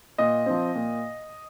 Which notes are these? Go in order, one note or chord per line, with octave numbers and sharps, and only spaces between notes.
A#2 D#5
F3 C4
A#2